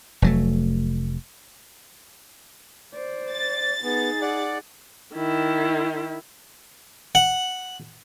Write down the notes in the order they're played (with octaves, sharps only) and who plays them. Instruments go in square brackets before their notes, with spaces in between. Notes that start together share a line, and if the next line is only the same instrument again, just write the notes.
[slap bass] F1 F#3 A3
[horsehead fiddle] C5 D5
[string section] A6
[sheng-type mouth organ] B3 [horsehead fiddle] D#4 G#4
[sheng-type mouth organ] D5 F#5
[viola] D#3 E4
[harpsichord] F#5